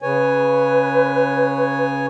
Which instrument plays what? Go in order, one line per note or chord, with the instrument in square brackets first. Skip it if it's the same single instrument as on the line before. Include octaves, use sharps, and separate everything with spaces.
[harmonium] C#3 C#5 G#5 [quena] B4